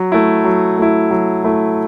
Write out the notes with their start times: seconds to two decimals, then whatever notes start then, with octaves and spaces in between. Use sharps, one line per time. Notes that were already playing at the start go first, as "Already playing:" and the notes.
Already playing: F#3
0.12 A3 E4
0.44 F#3
0.78 A3 E4
1.11 F#3
1.44 A3 E4